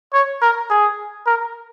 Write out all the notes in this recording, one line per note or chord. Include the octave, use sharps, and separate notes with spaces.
C#5
A#4
G#4
A#4